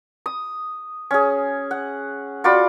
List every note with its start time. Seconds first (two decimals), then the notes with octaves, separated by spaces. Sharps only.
0.26 D#6
1.11 C#4 G#4
1.71 F#5
2.44 F4 F#4 D5 B5